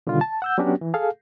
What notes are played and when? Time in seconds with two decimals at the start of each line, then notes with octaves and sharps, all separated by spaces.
0.07 B2 D3 D#3 G3 F4
0.21 A5
0.42 F#5 E6 G6
0.58 F#3 B3 C#4 D4 F#4 G4
0.81 E3
0.94 G#4 A4 F5